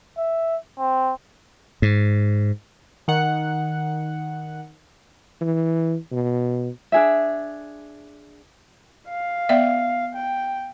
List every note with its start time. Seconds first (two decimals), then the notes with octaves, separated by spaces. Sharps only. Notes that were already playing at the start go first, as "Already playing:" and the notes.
0.18 E5
0.79 C4
1.82 G#2
3.08 D#3 F#5
5.41 E3
6.12 B2
6.92 D4 G#4 E5
9.09 F5
9.49 B3 D5 E5
10.15 G5